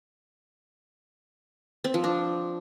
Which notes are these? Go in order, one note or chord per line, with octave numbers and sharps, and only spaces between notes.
C4
F3
D4